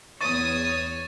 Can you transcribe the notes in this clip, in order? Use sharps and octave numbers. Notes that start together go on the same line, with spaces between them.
E2 C#5 C#6 D#6 A6 D#7